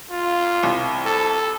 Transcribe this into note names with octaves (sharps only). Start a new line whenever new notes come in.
F4
C2
A4